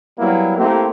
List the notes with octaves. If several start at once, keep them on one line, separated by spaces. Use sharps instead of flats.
F#3 G3 A#3 B3 E4
A3 A#3 C4 E4 G4